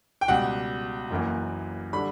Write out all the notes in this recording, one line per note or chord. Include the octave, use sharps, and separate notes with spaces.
G5
C#2 B2 G3 F#5
F#1 F#2 E3 A#3
D3 G3 B5